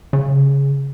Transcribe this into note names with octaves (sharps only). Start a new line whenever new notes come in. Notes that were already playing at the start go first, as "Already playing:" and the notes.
C#3